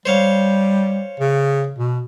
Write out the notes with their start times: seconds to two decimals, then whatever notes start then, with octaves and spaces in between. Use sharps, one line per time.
0.06 G3 C5 C#5 F5
1.20 C#3
1.78 B2